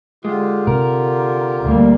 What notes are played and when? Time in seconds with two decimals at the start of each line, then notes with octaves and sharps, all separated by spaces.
0.25 D3 G#3 F4 G4
0.67 C3 A#4
1.62 D2 G3 A#3